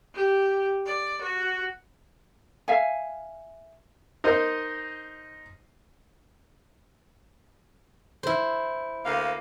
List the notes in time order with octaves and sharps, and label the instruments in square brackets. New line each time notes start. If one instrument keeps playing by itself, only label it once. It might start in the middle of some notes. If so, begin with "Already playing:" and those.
[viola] G4
D5
F#4
[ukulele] E5 F5 G#5
[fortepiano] D#4 A#4 C5 D#5
[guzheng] E4 C5
[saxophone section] D2 A#3 F5